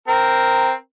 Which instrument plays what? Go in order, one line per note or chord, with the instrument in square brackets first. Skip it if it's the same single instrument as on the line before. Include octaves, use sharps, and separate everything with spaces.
[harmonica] C4 A#4